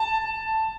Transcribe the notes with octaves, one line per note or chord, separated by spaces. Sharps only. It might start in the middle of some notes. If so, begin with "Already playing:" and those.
Already playing: A5